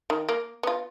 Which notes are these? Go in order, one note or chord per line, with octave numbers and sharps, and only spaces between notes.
D#3
A#3
B3 F4